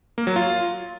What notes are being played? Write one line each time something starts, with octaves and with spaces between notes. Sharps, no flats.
A#3
F#3
F4